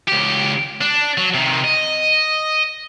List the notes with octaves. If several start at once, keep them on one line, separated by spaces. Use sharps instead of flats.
C#2 G4
D4
F#3
C3 D#3
D#5